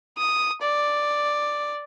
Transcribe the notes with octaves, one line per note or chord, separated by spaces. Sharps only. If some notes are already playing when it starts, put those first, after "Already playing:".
D#6
D5